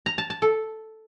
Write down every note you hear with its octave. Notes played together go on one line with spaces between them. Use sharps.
A#5
A5
A5
A4